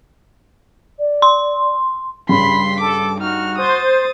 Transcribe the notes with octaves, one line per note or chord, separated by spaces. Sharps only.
D5
C6
G2 C#3 B5 C6 B6
A4 D6
D#4 F#4 F6
C5 D#6 A6